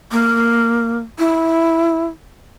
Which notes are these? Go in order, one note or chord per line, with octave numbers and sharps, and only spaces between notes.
A#3
E4